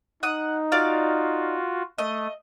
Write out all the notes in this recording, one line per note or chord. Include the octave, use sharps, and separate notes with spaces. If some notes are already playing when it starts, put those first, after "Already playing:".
D#4 F#5 D#6
F4 F#4 D5 F5
A3 D#5